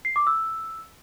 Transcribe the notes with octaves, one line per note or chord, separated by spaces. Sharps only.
C7
D6
E6